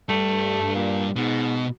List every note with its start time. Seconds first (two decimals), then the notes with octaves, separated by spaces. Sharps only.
0.09 G2 G3 A3
0.75 A#2
1.16 G#2 B2